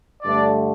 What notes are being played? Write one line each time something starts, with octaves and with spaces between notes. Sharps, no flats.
G2 D3 A3 D4 D5